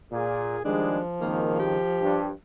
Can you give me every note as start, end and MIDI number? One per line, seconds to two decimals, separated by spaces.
0.12 0.58 46
0.12 0.64 68
0.65 0.99 51
0.65 2.33 53
0.65 0.99 55
0.65 0.99 56
0.65 1.01 62
1.21 1.77 32
1.21 1.77 37
1.21 1.77 51
1.21 1.59 58
1.60 2.32 67
2.01 2.30 43